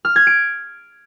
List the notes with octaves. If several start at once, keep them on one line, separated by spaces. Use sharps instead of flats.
F6
G#6
D7